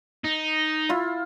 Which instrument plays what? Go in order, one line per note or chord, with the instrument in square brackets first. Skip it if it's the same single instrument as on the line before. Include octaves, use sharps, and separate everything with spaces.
[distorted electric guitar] D#4
[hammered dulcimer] E4 F4